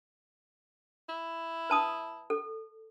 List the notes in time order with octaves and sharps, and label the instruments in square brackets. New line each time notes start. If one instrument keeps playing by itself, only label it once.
[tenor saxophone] E4
[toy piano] B4 A5 D#6
A4